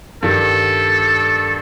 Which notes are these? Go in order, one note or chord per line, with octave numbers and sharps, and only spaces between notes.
G2 D#3 G3 A4